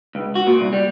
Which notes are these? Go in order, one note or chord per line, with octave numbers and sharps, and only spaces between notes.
C#2
F#4
A#2
C2
G3